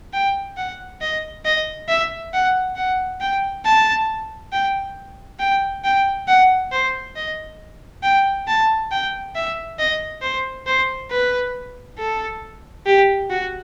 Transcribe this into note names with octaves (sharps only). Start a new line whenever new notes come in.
G5
F#5
D#5
D#5
E5
F#5
F#5
G5
A5
G5
G5
G5
F#5
C5
D#5
G5
A5
G5
E5
D#5
C5
C5
B4
A4
G4
F#4